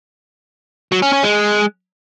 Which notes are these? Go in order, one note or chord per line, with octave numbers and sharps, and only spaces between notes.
F#3
C#4
C#4
G#3